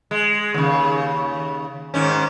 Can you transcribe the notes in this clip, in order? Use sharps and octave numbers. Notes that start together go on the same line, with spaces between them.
G#3
D#2 C#3
G#2 D#3 C#4